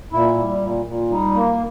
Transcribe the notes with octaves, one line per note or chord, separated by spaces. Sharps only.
A#2 E4
G3
A#2
A#2
G3 D#4
A#3